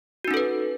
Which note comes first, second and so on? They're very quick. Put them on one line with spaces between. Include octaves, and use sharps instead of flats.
F#4 D#4 C#4 A4 B4